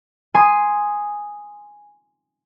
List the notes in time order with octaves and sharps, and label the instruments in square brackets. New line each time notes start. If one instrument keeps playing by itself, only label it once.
[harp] G#5 C6 D#6